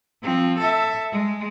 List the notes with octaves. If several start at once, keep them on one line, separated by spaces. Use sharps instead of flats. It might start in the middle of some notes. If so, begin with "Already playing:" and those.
F3 C4
A4 E5
G#3